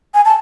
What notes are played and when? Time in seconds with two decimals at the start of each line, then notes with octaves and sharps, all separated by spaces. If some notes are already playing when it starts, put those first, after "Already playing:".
0.14 G#5
0.25 A5